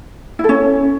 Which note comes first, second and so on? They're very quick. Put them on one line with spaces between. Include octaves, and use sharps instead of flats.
E4 A4 C#4